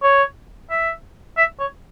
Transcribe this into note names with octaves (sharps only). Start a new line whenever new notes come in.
C#5
E5
E5
C#5